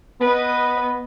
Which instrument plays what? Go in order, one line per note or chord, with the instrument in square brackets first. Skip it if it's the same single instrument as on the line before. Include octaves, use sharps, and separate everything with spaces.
[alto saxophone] B3 [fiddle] B4 D#5